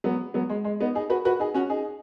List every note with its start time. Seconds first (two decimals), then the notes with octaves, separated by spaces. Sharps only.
0.04 F#3 B3
0.34 F#3 B3
0.49 G#3
0.64 G#3
0.80 B3 D#4
0.95 D#4 G#4
1.10 F#4 B4
1.25 F#4 B4
1.39 D#4 G#4
1.54 C#4 F#4
1.70 D#4 G#4